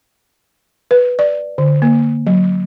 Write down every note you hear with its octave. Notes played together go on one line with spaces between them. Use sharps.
B4
D5
D3
A#3
F#3